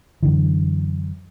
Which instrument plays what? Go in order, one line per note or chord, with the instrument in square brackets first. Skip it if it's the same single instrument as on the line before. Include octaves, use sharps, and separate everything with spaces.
[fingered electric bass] F#2 D3 E3